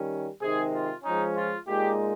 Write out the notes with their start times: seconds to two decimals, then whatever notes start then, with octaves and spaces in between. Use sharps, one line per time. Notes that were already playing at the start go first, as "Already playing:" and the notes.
Already playing: D#3 G3 C#4
0.40 C3 D#3 G#3 C4 D#4 G#4
0.73 F4
1.04 F3 G#3 C#4 D#4
1.36 F4
1.67 A#2 G#3 D#4 G4